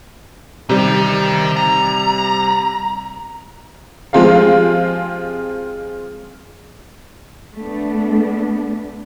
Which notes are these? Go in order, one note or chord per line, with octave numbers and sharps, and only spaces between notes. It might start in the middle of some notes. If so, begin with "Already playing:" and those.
C3 D#3 G3 D#4
A#5
F3 G#3 C4 F4 G4 F5
A3 B3 D4